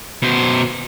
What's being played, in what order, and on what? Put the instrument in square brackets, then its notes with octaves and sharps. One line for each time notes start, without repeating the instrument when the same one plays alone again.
[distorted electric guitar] B2 C5